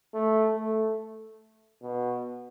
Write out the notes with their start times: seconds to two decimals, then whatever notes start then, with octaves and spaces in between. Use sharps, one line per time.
0.14 A3
0.56 A3
1.82 B2